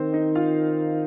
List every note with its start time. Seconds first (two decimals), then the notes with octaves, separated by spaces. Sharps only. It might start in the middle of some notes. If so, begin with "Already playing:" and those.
Already playing: D#3 C4 C5
0.13 D#4 D#5
0.35 F4 F5